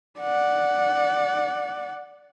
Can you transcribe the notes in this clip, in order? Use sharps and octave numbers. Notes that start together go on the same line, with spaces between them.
D5 F#5